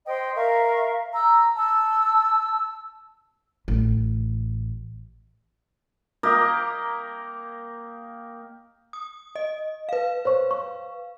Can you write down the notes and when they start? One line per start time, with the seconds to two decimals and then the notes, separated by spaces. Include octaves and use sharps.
0.06 C5 D#5 G5
0.35 A#4 E5 F5 C#6
1.12 A#5 E6
1.55 A5 E6
3.68 A1
6.23 A#3 G4 A#4 D#5
8.93 D#6
9.35 D#5
9.89 B4 F5
10.25 C5 C#5 C#6
10.51 C#6